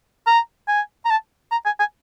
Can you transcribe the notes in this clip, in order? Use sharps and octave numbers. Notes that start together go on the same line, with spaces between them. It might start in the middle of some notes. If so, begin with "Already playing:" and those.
A#5
G#5
A#5
A5
A#5
G#5
G#5